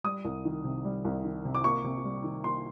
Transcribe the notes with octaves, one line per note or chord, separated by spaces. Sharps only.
G3 D#6
C2
D#3
C3
G3
C2
D#3
C3
D6
A#3 C#6
C3
G3
D#3
A#3 C6